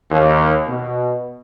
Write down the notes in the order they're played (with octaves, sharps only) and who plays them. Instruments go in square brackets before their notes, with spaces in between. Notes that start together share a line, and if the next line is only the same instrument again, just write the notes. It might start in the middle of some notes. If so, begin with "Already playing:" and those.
[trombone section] D#2
B2